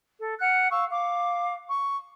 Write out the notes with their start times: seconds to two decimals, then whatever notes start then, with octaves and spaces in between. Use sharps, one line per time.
0.18 A4
0.40 F#5 F6 F#6
0.70 F5 C#6 E6
0.90 F5 D6
1.69 C#6